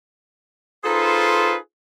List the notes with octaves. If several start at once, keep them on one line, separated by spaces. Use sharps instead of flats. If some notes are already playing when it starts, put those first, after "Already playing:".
D#4 F4 G#4 A4 B4 C5